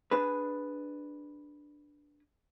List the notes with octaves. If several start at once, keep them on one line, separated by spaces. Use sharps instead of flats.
D4 G#4 B4